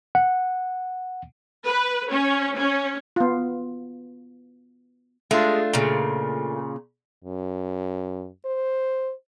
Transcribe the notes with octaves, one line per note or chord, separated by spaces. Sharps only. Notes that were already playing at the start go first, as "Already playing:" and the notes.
F#5
B4
C#4
C#4
B3 F4
G#3 A3 D4 F4
A#2 C#3
F#2
C5